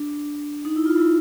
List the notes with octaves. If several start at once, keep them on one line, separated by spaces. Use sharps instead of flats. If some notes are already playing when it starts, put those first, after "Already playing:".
Already playing: D4
D#4
E4
F4
E4